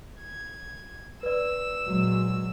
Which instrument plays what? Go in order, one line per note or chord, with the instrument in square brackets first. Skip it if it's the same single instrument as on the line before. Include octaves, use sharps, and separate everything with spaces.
[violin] G#6
[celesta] B4 D5 [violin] E6
[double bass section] A#2 F#3 G#3